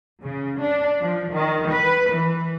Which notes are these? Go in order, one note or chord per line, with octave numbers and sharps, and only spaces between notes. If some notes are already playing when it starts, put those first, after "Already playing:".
C#3
D4
F3
D#3
B4
E3